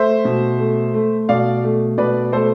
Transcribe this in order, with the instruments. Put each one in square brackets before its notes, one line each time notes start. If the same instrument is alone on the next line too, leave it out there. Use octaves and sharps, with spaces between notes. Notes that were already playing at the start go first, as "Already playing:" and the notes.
Already playing: [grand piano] A3 C5 E5
B2
A3
A3
B2 D5 F5
A3
B2 B4 D5
A3 A4 C5